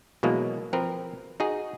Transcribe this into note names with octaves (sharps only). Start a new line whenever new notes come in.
B2 E3 F#3 G#3 A#3
F3 C4 A#4 B4
D#4 F#4 G#4